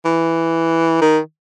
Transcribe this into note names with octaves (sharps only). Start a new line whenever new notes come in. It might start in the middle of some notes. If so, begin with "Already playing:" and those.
E3
D#3